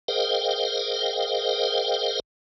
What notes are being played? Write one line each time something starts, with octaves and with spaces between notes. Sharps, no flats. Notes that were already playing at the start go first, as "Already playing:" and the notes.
G#4 A#4 C5 D#5 F5 G5